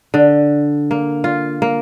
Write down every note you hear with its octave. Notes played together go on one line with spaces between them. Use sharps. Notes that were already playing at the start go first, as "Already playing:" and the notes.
D3
A#3
F4
A#3